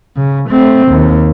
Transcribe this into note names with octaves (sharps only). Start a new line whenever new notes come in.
C#3
A3 C4
D#2